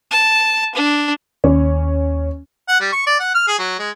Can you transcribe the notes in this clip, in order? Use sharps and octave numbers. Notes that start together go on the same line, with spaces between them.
A5
D4
D#2 C#4
F#5
G3
C#6
D5
F#5
F6
G#4
F#3
G#3